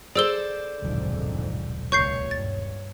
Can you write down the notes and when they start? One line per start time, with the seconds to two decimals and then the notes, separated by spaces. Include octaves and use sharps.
0.15 G#4 A4 C5 D5 E6 G7
0.82 D#1 B1 F2 G#2 D3 F#3
1.92 C#2 A#2 C#5 C#6 G6 C7
2.31 G2 A6